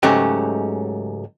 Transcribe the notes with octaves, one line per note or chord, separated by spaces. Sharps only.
C#2 G#2 F#3 A3 C#4 G4